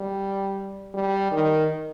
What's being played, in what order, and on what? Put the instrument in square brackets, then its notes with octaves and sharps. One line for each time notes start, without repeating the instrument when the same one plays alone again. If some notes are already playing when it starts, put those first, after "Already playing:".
Already playing: [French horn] G3
G3
D#3